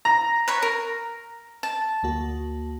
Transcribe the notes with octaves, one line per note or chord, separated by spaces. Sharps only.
A#5
B4 C#5 B5
A#4
A5
D2 A#3 F#4